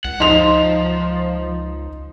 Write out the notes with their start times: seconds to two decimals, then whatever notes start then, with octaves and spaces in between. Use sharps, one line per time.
0.05 C#2 F#5
0.20 F3 D#4 C6 F7